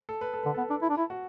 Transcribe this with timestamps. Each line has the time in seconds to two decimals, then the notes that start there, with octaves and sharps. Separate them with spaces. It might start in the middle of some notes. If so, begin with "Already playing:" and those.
0.09 A4
0.21 B4
0.33 A4
0.43 D3 B4
0.54 B3 A4
0.70 D4
0.82 E4
0.89 D4
0.97 E4
1.10 F#4